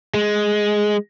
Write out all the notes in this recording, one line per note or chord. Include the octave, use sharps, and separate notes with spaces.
G#3